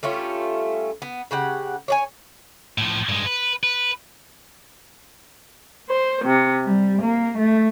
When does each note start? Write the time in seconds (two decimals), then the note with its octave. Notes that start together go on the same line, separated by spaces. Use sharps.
0.03 G3 A3 C#4 F4
1.02 B3
1.31 C#3 G4 F#5
1.88 C#5 D5 G#5
2.78 A2 F3
3.09 G2 G#3
3.26 B4
3.63 B4
5.90 C5
6.25 C3
6.64 G3
7.01 A#3
7.37 A3